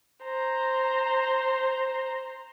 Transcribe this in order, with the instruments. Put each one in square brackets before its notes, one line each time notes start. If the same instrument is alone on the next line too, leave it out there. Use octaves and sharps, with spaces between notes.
[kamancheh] C5 A#5